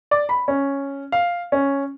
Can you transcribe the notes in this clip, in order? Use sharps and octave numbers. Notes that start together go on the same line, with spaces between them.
D5
B5
C#4
F5
C#4